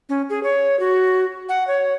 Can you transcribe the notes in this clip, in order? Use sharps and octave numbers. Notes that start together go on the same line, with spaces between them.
C#4
G#4
C#5
F#4
F#5
C#5